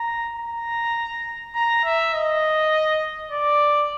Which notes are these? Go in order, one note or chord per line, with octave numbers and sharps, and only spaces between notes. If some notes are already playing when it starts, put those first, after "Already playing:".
Already playing: A#5
A#5
A#5
E5
D#5
D5